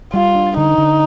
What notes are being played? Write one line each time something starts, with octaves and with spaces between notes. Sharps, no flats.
G3 F4
D4
D3 D#4
D3